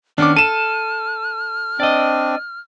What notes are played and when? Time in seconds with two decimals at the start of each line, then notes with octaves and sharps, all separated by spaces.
0.18 D#3 B3 C#4 D4 D6 F6
0.37 A4 D#7 E7
1.80 C4 D4 D5 D#5